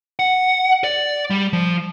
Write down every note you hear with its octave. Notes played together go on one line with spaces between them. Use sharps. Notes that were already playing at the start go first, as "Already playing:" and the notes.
F#5
D5
G3
F3